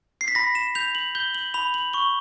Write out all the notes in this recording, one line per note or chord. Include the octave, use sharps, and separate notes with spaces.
C7
B6
B5 A#6
E7
G6 F7
F#7
G6 G7
F#7
B5 F7
F#7
C#6 G7